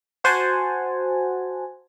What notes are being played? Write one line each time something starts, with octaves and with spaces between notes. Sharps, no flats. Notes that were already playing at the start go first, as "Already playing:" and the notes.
F#4 C5 F#5 G#5 A5